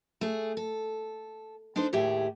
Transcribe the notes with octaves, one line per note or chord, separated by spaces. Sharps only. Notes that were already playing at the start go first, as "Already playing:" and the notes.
A3 G#4
A4
D4 D#4 A4 C5
D#2 A2 G4 G#4 E5